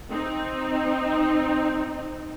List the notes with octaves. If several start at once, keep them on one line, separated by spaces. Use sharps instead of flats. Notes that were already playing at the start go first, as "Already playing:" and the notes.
C4 D#4